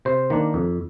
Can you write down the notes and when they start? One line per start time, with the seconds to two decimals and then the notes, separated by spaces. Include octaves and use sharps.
0.05 C3 C5
0.30 D#3 A#3 D4
0.54 F2